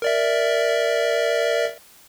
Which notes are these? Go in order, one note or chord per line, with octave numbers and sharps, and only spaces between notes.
A#4 D5 E5